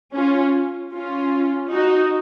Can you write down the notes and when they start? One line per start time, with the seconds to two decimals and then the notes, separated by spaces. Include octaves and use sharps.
0.14 C#4 F4
0.92 C#4 F4
1.71 D#4 F#4